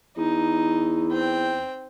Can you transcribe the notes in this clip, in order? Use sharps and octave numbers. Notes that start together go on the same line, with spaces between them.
E2 D#4
C4 G5